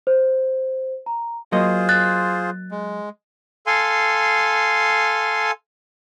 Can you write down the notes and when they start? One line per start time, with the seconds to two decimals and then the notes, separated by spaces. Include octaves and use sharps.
0.07 C5
1.06 A#5
1.52 F#3 A#3 F4 G#4 C5 D#5
1.89 F#6 A6
2.71 G#3
3.67 A4 F5 G#5 C6